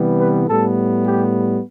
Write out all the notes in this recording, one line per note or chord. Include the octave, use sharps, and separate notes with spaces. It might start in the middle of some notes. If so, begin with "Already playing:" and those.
Already playing: C3 E3 G3 B3
B4
A2 G3 B3 A4
G4